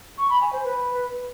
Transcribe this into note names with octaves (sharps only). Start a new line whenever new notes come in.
C#6
B5
G#5
C5
B4